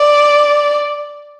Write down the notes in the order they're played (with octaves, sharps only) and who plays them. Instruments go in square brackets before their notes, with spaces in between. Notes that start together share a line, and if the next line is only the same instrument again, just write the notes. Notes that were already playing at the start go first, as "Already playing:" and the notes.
Already playing: [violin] D5